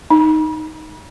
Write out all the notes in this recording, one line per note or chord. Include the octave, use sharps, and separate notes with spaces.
D#4